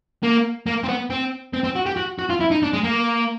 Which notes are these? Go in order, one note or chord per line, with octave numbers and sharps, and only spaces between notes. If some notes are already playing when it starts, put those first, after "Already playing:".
A#3
A#3
C4
B3
C4
C4
C4
F#4
G4
F#4
F#4
F4
E4
D#4
D4
G#3
A#3